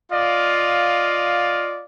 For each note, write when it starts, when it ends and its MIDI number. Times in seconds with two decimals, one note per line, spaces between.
0.12 1.85 65
0.12 1.85 74
0.12 1.85 75
0.12 1.85 77